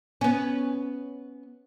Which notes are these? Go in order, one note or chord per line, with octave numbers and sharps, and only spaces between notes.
B3 C#4